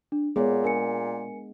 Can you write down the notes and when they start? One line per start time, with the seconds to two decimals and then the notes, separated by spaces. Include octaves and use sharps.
0.12 D4
0.36 A#2 G#3 B3 G#4 C#5
0.64 D4 A#4 G#5 C#7